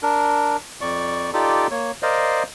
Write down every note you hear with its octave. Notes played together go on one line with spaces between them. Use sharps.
D4 A#4
F2 D5 C#6
D#4 F4 G4 A4 D5
A#3 C#5
A#4 C5 D5 D#5 F5